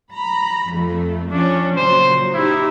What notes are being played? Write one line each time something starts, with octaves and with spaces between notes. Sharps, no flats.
A#5 B5
F2 A3
F3 C#4 D4
A#2 C#3 F#3 C5
D#4 E4 G4